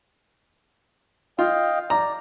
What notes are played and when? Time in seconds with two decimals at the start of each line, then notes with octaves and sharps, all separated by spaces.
1.39 F4 D#5 F5 G5
1.90 D5 A#5